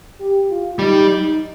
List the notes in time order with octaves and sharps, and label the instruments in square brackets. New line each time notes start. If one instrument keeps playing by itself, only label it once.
[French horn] G4
F4
[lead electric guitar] G3 [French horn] D#4
[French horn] D#4